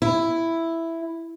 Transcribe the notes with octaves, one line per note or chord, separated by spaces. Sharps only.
E4